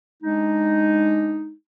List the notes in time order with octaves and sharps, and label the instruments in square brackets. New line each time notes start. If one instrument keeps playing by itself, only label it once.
[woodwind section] G#3 D4 D#4